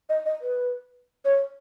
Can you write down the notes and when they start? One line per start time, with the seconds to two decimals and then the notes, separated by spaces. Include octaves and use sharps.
0.09 D#5
0.26 D#5
0.42 B4
1.25 C#5